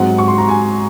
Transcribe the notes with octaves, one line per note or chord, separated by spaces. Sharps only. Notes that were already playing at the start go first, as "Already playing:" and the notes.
Already playing: G#2 F#3 C4 F#5
C#6
C6
A#5
G#5